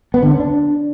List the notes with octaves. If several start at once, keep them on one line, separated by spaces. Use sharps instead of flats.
B3
D3
C#4
D4